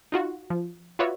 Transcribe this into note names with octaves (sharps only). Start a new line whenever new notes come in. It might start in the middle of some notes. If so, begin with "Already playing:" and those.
D#4 F4 F#4
F3
F4 F#4 B4 C#5 D5 E5